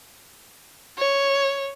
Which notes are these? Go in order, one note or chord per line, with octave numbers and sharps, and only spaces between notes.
C#5